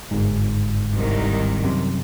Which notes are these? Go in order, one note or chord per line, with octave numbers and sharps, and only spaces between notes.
G1 G#2
C2 D#3
F#2 C3